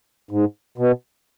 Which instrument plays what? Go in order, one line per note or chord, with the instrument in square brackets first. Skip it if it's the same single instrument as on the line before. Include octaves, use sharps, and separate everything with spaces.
[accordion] G#2
B2